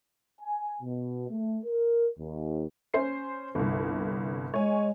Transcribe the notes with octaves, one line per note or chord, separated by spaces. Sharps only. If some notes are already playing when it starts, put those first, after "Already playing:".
G#5
B2
A3
A#4
D#2
C#4 C5 C7
G1 C2
G#3 C#5 G#5